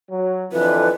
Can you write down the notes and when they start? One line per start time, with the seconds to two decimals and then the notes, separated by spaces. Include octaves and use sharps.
0.11 F#3
0.52 F2 D3 E3 B4